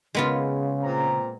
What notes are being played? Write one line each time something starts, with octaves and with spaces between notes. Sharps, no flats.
C#3 G#3 B3 F4
A#2 C4 A#5